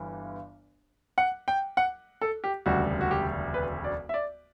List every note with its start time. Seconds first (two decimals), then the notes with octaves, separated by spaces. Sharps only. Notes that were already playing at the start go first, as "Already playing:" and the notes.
Already playing: G1 G2 E3
1.18 F#5
1.48 G5
1.77 F#5
2.21 A4
2.44 G4
2.66 E1 D2 C#3 G3 F#4
3.01 F#4
3.11 G4
3.54 B4
3.84 D5
4.09 E5
4.14 D5